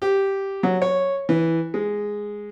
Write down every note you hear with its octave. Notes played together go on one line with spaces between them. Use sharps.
G4
F#3
C#5
E3
G#3